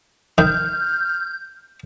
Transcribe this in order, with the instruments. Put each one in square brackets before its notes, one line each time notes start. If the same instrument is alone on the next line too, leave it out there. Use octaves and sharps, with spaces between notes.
[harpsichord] D#3 [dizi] F6 [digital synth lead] G6